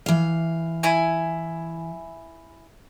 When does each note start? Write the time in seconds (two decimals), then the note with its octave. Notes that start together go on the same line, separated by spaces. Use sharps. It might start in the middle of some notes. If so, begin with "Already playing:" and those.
0.06 E3 F5
0.83 E4 G#5